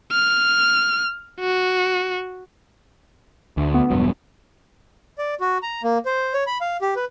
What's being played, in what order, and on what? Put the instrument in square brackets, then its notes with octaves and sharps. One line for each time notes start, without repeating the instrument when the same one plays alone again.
[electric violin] F6
F#4
[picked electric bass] D2
[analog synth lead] B3
[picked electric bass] E1 G2 F#3
[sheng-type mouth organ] D5
F#4
A#5
A#3
C5
C#5
B5
F5
G4
B4